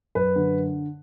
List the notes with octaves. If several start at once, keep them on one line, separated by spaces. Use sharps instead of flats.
F#2 B4
D3